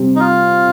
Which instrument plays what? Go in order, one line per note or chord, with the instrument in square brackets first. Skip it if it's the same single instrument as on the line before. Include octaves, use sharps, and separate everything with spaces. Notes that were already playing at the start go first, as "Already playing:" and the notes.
Already playing: [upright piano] C3 G3 C4
[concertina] D#4
F4